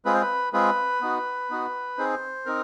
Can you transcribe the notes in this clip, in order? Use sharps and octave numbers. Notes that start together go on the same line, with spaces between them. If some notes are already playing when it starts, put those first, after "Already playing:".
G#3 C4 F4 G#4 B4
C5
B4
G#3 C4 F4 G#4 B4
B3 D#4 F#4
B3 D#4 F#4
C4 D#4 G#4 C5
C4 D#4 A#4